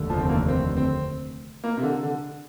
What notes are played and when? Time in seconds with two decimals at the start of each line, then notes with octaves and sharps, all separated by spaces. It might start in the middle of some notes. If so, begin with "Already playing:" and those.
Already playing: F1 D#2 D3 A3
0.10 F3
0.20 C4
0.29 A#3
0.48 C4
0.77 C4
1.64 A#3
1.77 C3
1.83 D3
2.03 D3